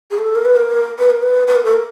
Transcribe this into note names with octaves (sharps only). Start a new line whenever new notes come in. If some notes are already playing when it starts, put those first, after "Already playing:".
G#4
A4
A#4
B4
A#4
B4
A#4
B4
B4
A#4
A4
A#4